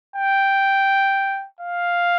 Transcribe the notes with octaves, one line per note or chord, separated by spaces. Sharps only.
G5
F5